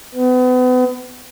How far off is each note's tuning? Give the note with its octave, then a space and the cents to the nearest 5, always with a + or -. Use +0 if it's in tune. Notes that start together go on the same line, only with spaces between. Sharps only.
B3 +35